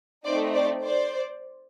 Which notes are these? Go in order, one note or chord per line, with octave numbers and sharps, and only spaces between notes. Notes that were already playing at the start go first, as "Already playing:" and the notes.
A3 C4 D#4 C5 D5
C5 D5
C5 D5